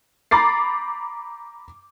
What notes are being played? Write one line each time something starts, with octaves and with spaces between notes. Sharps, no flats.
A#5 B5 D6 A6 C7